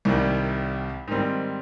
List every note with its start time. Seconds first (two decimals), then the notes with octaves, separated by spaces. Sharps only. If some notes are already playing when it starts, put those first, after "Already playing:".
0.05 C2 C3 D#3 G3
1.08 G#2 D#3 G3 C4